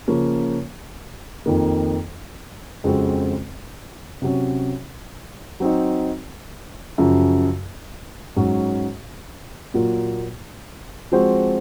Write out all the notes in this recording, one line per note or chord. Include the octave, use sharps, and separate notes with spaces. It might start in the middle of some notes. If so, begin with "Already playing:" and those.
C#3 F3 A#3 C#4
F2 D#3 A#3
F2 C#3 G#3 C4 F#4
C3 F#3 C#4
F#3 C4 D#4
F#2 C#3 F3
G#2 F#3 C#4
A#2 F#3 A#3 F4
F3 G#3 C4 F#4 C5